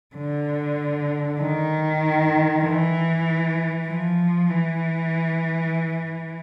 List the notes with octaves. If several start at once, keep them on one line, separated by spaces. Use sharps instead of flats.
D3
D#3
E3
F3
E3